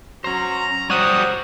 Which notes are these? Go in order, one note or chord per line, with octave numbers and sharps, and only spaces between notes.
F#3 C#4 C5 A#5
G3 F#4 C5 C#5 F#5 D#6